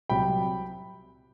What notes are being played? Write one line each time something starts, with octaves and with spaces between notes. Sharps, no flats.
C2 C3 F#3 G5 B5